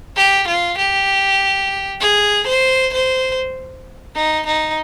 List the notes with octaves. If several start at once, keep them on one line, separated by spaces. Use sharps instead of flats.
G4
F4
G4
G#4
C5
C5
D#4
D#4